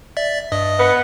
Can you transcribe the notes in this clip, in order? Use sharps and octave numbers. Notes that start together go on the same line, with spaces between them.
D5 E5 A6
G2 D#5 D#6
B3